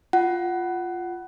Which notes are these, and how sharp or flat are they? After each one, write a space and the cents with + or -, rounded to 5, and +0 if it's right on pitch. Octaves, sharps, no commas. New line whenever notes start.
F4 +0 F#5 +20